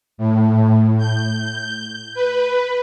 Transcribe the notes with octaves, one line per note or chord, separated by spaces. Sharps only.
A2
G6
B4